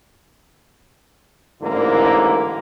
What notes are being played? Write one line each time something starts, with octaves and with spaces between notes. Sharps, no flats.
A1 G#2 D3 A#3 E4 A#4